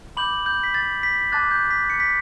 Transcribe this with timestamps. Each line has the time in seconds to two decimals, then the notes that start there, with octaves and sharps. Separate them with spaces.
0.17 B5 D6 G6 F#7
0.46 G6
0.64 B6
0.74 A6
1.03 B6
1.32 A5 D6 F#6 A6
1.51 G6
1.71 B6
1.90 C#7
2.00 B6